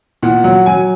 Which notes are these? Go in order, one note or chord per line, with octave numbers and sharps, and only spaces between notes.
A#2 F#5
F#3 F#5
F#3 G#5